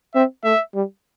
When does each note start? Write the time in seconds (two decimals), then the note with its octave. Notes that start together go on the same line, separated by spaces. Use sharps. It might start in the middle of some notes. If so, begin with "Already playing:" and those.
0.15 C4 E5
0.44 A3 E5
0.75 G3